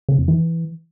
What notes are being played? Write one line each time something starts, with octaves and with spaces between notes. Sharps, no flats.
C#3
F2
E3